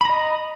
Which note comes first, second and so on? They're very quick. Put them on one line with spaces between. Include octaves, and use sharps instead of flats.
B5 A#5 D#5